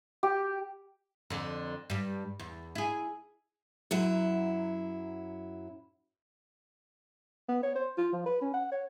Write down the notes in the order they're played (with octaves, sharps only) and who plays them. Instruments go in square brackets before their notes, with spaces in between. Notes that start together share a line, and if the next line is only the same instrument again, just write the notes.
[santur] G4
[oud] F2 D3
G2 G3
E2
E4 G#4
[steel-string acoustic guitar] F#2 F#3 E4
[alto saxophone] B3
C#5
C5
F4
F3
B4
C#4
F#5
C#5